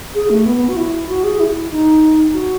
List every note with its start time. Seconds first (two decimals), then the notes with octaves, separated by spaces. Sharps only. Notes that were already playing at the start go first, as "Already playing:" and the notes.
0.15 G#4
0.30 A3
0.46 B3
0.56 B3
0.69 F#4
0.77 E4
1.09 F#4
1.24 G#4
1.39 E4
1.71 D#4
2.33 F#4